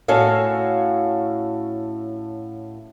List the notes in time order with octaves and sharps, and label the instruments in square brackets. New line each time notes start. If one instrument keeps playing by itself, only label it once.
[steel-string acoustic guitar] A2 C#4 F#4 A4 F5